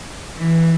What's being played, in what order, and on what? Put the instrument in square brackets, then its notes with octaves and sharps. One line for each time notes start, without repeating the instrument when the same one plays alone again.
[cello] E3